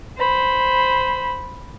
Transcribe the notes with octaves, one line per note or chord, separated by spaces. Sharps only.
C5 B5